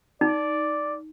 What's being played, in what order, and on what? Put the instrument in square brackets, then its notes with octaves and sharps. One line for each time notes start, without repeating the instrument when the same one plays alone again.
[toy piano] D#4 [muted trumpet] D5